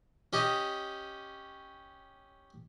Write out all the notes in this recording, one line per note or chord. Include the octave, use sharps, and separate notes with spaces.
C#4 G4 D#5